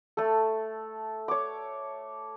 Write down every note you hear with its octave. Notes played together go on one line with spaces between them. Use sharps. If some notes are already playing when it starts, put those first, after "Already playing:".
A3 A4
C#5 D6